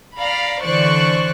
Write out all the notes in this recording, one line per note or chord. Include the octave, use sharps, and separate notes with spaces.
D5 F5 A#5 B5
D3 E3 C5 D5 C#6 F#6